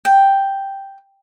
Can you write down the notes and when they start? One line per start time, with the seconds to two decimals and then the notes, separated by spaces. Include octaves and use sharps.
0.05 G5